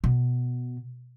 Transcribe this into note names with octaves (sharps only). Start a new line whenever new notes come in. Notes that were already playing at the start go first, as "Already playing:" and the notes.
B2